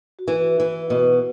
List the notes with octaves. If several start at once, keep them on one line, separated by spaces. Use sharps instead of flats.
F#4
E3 E4
E3
B2 F#4